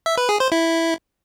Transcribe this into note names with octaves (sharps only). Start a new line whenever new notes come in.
E5
B4
G#4
C5
E4